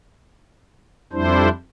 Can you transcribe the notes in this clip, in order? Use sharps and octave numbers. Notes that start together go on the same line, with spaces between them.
F2 G3 D4 E4 C5